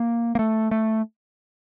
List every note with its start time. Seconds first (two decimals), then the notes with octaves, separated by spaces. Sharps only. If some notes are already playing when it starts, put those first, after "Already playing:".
Already playing: A#3
0.35 A#3
0.39 A3
0.71 A3